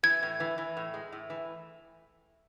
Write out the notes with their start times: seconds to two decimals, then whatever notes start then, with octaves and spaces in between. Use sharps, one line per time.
0.03 E3 G#6
0.23 A2
0.40 E3
0.58 E3
0.77 A2
0.94 G#3
1.12 A2
1.30 E3